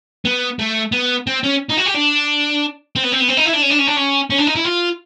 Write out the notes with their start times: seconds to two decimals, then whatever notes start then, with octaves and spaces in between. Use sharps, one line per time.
0.25 B3
0.59 A3
0.92 B3
1.27 C4
1.43 C#4
1.69 D#4
1.77 F#4
1.85 G4
1.94 D4
2.96 C4
3.04 B3
3.12 C4
3.20 B3
3.29 C4
3.37 D#4
3.46 E4
3.54 D4
3.63 C#4
3.71 D4
3.79 C#4
3.88 D4
3.97 C#4
4.30 C#4
4.38 D4
4.47 D#4
4.55 E4
4.65 F4